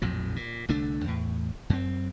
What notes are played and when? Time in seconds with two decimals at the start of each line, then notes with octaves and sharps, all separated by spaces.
0.02 A#1 F2 A2 F#3
0.36 A#2
0.68 C2 D3 A3 D4
1.04 E2 A2
1.70 F#2 C4